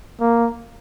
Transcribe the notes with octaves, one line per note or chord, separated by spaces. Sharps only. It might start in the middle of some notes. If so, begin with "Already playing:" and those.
A#3